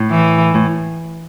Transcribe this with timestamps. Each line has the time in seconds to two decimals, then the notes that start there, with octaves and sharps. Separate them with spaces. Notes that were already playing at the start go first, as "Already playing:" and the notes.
Already playing: A2
0.10 E3
0.55 A2